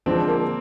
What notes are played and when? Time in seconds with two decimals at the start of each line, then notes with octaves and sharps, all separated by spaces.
0.06 D3 F3 G#3 C4 D4
0.28 A#3